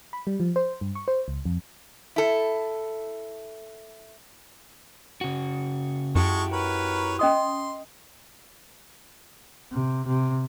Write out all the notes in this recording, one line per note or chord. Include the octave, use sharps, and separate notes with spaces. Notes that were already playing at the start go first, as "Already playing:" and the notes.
B5
G3
F3
C5
G2
C#6
C5
C#2
F2
E4 A4
C#3 F#4
F#2 G#3 E4 F#4 G4 A5 C#6
A#4 B4 C#5
C#4 D#5 C6 D#6
C3
C3